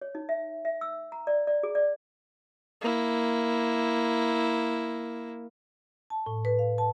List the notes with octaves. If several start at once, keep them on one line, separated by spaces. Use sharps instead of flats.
C#5
D#4
E5
E5
E6
A#5
D5
D5
G#4
D5
A#3 E4
A5
A2
B4
F5
A5